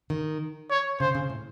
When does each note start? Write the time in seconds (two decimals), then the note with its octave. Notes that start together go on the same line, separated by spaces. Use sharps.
0.10 D#3
0.70 C#5
1.00 C#3 C5
1.15 C#3
1.30 A2